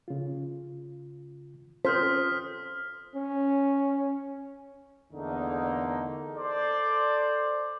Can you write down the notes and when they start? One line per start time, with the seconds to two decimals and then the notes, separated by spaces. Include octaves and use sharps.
0.08 C#3 F4
1.85 C#4 F4 A4 C5 D#6 F6 B6
3.16 C#4
5.12 E2 D3 A3 A#3 D#4
6.37 A4 C5 D5